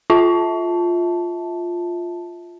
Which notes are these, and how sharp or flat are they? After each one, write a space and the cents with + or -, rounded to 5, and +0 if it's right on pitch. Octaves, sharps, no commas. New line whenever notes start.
F4 +0 E5 -25 A5 +0